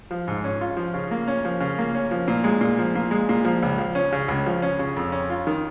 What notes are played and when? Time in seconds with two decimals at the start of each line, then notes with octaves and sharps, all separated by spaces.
0.11 F3
0.28 G#2
0.44 C#4
0.61 F4
0.77 F3
0.94 C#3
1.11 A#3
1.28 C#4
1.45 F3
1.60 C#3
1.78 A#3
1.95 C#4
2.11 F3
2.28 A#2
2.44 G#3
2.61 A#2
2.78 F3
2.95 A#2
3.11 G#3
3.29 A#2
3.45 F3
3.62 C#2
3.78 F3
3.95 C#4
4.12 C#3
4.28 C#2
4.46 F3
4.62 C#4
4.79 C#3
4.96 F2
5.12 C#4
5.30 F4
5.47 D#3